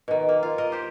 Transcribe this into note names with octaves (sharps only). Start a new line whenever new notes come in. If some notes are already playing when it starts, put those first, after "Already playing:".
B2 D#3
A#3
F4
A#4 D#5
G4 C5